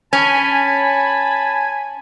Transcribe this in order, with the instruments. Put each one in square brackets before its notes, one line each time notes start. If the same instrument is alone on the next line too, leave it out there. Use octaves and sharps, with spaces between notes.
[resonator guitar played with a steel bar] C#4 [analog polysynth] G#5 [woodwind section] A5 B5